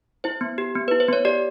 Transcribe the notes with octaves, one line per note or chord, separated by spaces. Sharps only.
E4 C5
B3
G4
B3
E4 B4
C5
B3 C#5
G4 D5